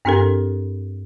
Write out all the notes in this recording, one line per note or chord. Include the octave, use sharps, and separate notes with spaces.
G2 C4 D4 G4 A4 A#4